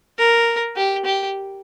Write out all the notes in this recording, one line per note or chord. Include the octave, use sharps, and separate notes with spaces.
A#4
G4
G4